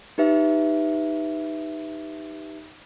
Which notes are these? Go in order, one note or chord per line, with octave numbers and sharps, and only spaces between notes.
D#4 G4 B4 E5